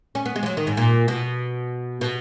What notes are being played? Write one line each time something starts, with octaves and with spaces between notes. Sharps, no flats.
C#4
B3
G#3
F3
F#3
D#3
G#2
A#2
B2
B2